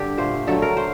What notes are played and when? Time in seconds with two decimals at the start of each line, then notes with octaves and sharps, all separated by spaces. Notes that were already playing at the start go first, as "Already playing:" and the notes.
Already playing: G2 D3 G4
0.17 A#2 A3 C5
0.47 D3 F#3 A3 A4
0.62 A#4
0.77 A3 C5